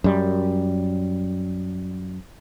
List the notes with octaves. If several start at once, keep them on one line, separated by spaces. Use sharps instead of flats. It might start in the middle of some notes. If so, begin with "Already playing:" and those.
F#2 G3